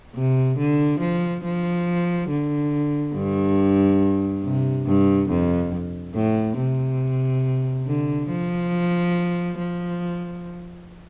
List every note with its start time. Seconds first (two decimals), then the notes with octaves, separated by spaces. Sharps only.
0.15 C3
0.58 D3
1.00 F3
1.44 F3
2.29 D3
3.14 G2
4.43 C3
4.86 G2
5.29 F2
6.15 A2
6.57 C3
7.87 D3
8.29 F3
9.58 F3